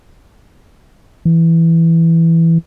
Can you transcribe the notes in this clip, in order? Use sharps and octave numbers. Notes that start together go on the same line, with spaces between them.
E3